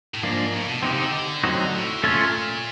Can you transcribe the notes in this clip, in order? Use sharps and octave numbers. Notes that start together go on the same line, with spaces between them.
A2
G#2 F3 A#3 D4
A2
B2
C3 C4 D#4 G4
C#3
D3
D3
F#3 A3 C4 D#4 F#4
A2
A#2 A3 C#4 F4 A4 C#5